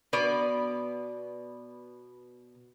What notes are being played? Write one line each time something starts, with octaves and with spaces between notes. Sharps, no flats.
B2 B3 D5